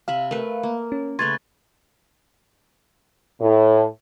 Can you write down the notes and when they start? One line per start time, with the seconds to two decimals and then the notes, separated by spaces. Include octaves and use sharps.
0.08 C3 E5 F5 B5
0.31 A3 A#4 B4
0.63 A#3
0.92 C#4
1.19 C#3 A3 B4 C6 C#6 G#6 A6
3.41 A2